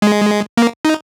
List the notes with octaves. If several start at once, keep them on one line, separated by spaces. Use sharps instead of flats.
G#3
A#3
D#4